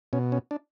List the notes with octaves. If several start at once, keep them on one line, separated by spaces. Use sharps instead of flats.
B2 C#4
C#4
D4